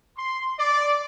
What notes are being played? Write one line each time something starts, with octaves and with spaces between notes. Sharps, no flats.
C6
D5